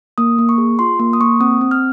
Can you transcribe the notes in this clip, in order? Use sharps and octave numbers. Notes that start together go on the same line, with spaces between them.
A#3 D#6
A#3
C#6
G#4
F4 C6
A#3 C6
D#6
A#3 C#6
C4 D#6
C4
F6